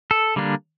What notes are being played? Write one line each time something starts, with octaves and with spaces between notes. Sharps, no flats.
A4
D3 G3 A#3 D4